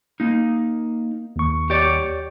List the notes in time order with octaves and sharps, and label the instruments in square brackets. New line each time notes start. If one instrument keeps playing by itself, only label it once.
[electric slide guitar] A#3 D#4
[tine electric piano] D#2 C#6
[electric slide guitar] G4 C#5 D5